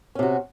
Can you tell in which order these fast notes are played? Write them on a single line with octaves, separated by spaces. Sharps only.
C#4 C3 F#4